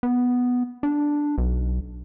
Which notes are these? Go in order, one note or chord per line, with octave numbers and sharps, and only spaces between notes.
B3
D4
B1